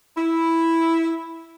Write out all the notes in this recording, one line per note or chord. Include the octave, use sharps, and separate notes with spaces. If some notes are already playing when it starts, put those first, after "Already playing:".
E4